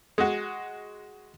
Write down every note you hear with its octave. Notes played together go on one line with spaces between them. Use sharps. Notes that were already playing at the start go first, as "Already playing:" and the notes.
G#3 F#4